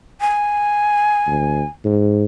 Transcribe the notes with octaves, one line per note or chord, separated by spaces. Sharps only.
G#5
D2
G#2